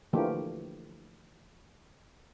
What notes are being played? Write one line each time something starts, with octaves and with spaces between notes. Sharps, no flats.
D3 E3 F3 A3 A#3 G4